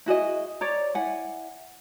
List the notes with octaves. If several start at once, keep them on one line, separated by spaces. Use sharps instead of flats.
E4 F#4 G#4 D#5
C#5 D5 A#5
E4 F#5 G#5